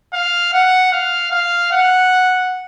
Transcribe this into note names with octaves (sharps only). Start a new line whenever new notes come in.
F5
F#5
F5
F5
F#5